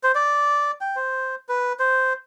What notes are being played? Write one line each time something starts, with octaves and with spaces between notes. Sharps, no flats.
C5
D5
G5
C5
B4
C5